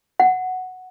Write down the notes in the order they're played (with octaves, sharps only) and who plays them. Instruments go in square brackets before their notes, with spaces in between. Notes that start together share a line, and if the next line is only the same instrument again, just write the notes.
[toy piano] F#5